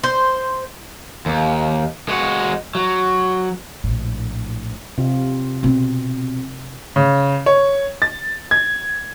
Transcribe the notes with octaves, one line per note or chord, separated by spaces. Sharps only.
C5
D#2
G#3 F#4
F#3
A#1 A2
C3 F4
B2 C4
C#3
C#5
A6
G#6